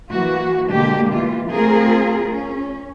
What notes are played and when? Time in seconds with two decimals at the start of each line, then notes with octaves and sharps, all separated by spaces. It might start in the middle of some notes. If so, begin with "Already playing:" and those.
0.11 E3 A#3 F#4
0.71 B2 D3 G#3 A#3 G4
1.12 E3 F4
1.51 A3 C4 F4 G#4 A#4
2.31 C#4